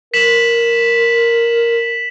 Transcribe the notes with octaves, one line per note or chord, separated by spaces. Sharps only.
A#4 B6 E7 F#7